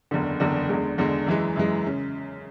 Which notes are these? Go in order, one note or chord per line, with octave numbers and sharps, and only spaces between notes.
F#1 E2 D3
F#1 E2 D3
E2 D3 G#3
E2 D3 G#3
F#2 E3 G#3
F#2 E3 G#3
C#3